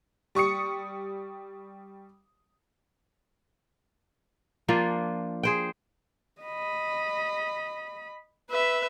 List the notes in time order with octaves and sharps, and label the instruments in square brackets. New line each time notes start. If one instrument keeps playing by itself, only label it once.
[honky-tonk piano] G3 C#6 D#6 C#7
[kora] F3 A#3 D4 F4
G#4 C5 G5
[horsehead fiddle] D#5 B5
[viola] B4 E5